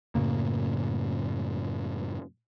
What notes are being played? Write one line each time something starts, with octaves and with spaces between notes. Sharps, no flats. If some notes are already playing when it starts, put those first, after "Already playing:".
F#2 A2 C#3 A#3